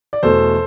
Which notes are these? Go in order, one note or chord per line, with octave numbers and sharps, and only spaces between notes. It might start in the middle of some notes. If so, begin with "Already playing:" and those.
D5
E2 B2 A3 A4 C5